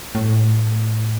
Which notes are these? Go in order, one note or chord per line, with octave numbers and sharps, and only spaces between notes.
A2